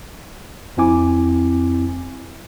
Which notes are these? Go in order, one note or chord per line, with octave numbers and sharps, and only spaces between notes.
F2 C4 E4 G#5 D6